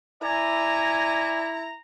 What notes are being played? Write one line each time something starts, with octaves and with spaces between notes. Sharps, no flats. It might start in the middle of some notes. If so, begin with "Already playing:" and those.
E4 D5 G#5 A#5